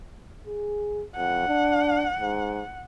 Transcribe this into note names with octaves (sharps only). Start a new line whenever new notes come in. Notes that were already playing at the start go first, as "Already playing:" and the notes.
G#4
F2 F#5
D4
G#2